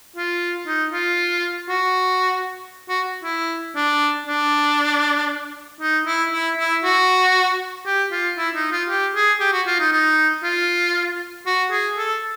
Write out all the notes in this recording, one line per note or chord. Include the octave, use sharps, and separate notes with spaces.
F4
D#4
F4
F#4
F#4
E4
D4
D4
D#4
E4
E4
E4
F#4
G4
F4
E4
D#4
F4
G4
G#4
G4
F#4
F4
D#4
D#4
F4
F#4
G#4
A4